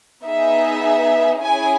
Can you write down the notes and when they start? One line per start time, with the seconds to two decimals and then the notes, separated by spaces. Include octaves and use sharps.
0.25 B3 D#4 G#4 E5
1.42 C#4 E4 G#4 G#5